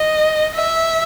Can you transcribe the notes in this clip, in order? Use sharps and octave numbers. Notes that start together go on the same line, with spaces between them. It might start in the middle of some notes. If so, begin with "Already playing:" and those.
Already playing: D#5
E5